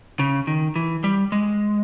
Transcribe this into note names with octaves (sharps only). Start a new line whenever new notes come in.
C#3
D#3
E3
G3
G#3